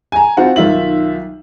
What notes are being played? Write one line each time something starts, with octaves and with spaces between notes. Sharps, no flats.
G#5 A#5
C4 F4 F#4 C5 F#5
B1 D#3 F4 E5 F#7